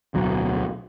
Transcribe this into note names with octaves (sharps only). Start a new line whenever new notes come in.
D1 B1 F#3